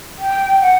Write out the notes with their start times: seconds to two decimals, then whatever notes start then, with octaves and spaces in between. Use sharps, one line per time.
0.19 G5
0.60 F#5